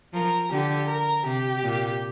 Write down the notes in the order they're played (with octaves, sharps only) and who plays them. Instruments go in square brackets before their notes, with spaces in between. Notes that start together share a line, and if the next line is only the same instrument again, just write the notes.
[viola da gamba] F3 [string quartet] A#4
[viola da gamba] D3 [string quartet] G4
[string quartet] A#4
[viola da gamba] C3 [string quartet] G4
[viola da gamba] A#2